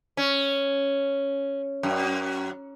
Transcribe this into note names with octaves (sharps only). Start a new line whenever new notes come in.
C#4
F#2